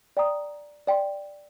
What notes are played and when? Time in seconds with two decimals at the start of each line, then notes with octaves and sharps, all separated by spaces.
0.17 D5 G5 A#5 D#6
0.87 D5 G5 C6